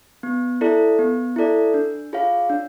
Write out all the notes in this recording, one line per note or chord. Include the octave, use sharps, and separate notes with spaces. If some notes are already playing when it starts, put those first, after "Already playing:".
B3
E4 A4 D5
B3
E4 A4 D5
D4
F4 G#4 C#5 F5
D4